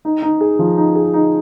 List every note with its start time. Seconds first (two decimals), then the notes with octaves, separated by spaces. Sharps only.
0.05 D#4
0.22 D#4
0.41 G#4
0.59 F3
0.77 D#4
0.95 G#4
1.14 D#4